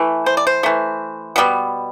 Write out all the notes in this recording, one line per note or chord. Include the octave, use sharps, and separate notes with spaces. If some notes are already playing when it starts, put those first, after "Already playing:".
Already playing: E3 A3
C5
D5
C5
E3 A3
B2 G3 B3